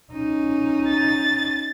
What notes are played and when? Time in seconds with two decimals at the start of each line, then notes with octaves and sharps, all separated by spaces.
0.13 C#4 D#4
0.89 A6